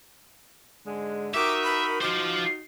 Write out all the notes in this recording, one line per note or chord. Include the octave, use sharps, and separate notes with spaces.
G#2 D3 G#3
D#4 F#4 A#4 E5 D6
B5
D#4 F4 F#4 C5 D6